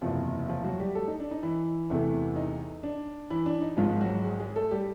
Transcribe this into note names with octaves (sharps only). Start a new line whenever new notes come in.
F#1 E2 C3 F3 F4
F3 F4
F#3 F#4
G3 G4
A3 A4
D#4
D4
D#4
E3 E4
E2 C3 E3 A3
D#4
D4
E3 E4
D4
D#4
G#1 G#2 F3 F4
F#3 F#4
G#3 G#4
G#3 G#4
A3 A4
G3 G4